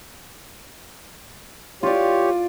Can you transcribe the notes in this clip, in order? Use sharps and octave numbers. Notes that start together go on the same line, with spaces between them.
F4 G4 C#5 D5